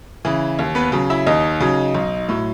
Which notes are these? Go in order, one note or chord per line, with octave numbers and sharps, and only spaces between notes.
C#3 E3
D#2
B3 B4
C#3 F#3
E4 E5
D#2 D#4 D#5
C#3 F#3
B1
A2 F#3